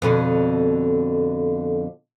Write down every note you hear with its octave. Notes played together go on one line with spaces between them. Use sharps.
F2 B2 D3